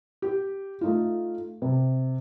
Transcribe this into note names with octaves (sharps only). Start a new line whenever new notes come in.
G4
A3 D#4 F4
C3